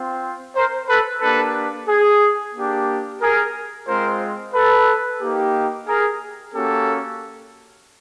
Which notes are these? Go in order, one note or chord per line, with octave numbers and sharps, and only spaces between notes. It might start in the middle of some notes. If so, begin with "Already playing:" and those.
Already playing: C4 F4
A#4 C5
A4 B4
A#3 D4 G4 A4 B4
G#4
A#3 D4 G4
G#4 A#4
G#3 C4 F4 A#4 C5
A4 B4
A#3 D#4 G4
G#4 A#4
A#3 C#4 F#4 G4 A4